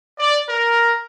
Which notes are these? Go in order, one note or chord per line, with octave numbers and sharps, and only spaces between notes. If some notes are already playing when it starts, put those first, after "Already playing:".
D5
A#4